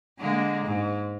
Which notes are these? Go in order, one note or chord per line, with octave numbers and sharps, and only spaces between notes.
D3 G#3 A#3
G#2